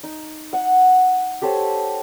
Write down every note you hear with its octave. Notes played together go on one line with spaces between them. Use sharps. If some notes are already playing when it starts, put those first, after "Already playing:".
D#4
F#5
G4 A4 C5 C#5